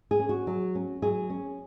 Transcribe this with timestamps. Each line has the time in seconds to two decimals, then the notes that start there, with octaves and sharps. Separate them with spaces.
0.11 G#4
0.19 C#4
0.29 F#4
0.47 F#3
0.75 C#4
1.02 F#3 G#4
1.30 C#4